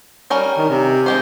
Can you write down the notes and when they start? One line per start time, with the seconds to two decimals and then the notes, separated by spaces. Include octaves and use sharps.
0.30 G3 C#4 A#4
0.58 D#3
0.70 C3
1.06 G#3 G4 C5